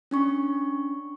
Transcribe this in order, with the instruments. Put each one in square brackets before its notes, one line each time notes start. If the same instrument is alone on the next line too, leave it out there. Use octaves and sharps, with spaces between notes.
[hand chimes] C#4 D4 C#6